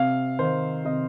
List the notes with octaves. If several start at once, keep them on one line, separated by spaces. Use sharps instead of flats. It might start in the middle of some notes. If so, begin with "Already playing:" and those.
Already playing: C3 F5
D#3 C5
C3 D#5